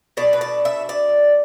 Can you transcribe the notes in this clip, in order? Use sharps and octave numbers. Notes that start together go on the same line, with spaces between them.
B2 A3 D4 D5
B4
D5
E5
D5